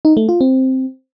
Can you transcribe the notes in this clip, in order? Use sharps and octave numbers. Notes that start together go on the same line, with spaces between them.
D#4
A3
F4
C4